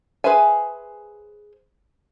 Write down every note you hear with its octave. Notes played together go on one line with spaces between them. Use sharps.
G#4 B4 C5 E5 G#5